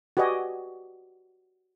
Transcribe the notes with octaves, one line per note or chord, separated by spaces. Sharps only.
F#4 G4 B4 D5 D#5 G#5